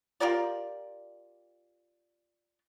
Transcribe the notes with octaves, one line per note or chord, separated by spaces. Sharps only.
F4 G4 A#4 D5